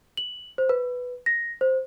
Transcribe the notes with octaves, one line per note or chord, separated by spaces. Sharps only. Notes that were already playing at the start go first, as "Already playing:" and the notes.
F#7
C5
B4
A#6
C5